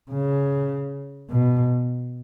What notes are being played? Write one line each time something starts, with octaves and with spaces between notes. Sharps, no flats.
C#3
B2